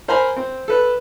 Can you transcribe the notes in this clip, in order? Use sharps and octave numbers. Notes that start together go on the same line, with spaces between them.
A#4 C5 G#5 A#5 B5
C4
A4 B4